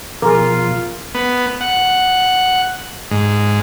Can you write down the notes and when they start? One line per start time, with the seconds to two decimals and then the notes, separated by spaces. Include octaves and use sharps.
0.22 B2 F3 F4 G#4 A#4
1.15 B3
1.61 F#5
3.11 G#2